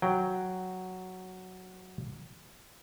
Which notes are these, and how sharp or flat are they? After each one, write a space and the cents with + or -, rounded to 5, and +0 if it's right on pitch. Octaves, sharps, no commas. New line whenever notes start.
F#3 +0 G5 +0